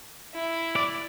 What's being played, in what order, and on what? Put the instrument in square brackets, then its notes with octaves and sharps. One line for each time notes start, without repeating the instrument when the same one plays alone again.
[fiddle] E4
[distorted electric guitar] D5